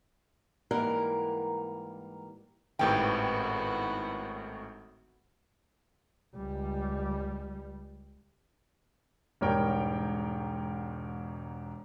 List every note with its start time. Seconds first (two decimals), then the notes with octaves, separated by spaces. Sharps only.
0.71 G#2 E3 G3 A#3 A#4 F#5
2.79 G#1 A2 D#3 B3 F#4 G4 B4 G5
6.36 C#2 G3
9.41 E1 G#2 G3 A#4 C#5 G5